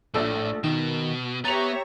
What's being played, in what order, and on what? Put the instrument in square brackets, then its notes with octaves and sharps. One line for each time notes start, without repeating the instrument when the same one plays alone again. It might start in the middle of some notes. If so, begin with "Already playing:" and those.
[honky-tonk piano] A#1 D4 E6 [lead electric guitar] A2 [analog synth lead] A3
[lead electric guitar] B2 [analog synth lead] D#3 [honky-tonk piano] E7
[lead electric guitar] B3 [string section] G4 C#5 E5 [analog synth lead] A#5 [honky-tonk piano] A6 F7